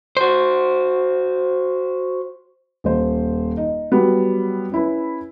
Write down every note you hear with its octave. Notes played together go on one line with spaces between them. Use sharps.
F#4 C5
D#1 C5
D#4
F#3 G3 B3
C#4 E4 B4